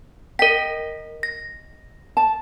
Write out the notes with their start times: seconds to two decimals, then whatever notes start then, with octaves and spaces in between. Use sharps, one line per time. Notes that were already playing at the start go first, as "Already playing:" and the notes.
0.39 A#4 D#5 G5 B6
1.23 A#6
2.17 A5